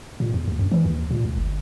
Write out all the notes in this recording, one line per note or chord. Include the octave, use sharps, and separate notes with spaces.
A#2
E2
D#2
F#2
E3
D#2
A#2
C#2
G1